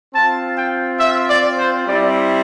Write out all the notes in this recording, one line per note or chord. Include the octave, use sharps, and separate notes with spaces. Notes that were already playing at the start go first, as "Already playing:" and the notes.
C4 F4 A5
G5
E5
D5
C5
G3 C4 E4 D5